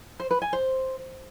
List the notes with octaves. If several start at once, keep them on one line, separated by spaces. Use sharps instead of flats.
C5
B4
G#5
C5